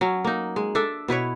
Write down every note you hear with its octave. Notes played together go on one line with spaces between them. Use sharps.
F#3 C#4
A#3 D#4
G#3
D4 A4 E5
B2 E4 B4 C#5